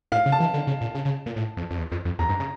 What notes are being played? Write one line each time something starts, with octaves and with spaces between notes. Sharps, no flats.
A2 F5
C#3
A5
E3
D3
C#3
A#2
C#3
C#3
A#2
A2
F2
F2
E2
F2
F2
E2 A#5
G2
C#3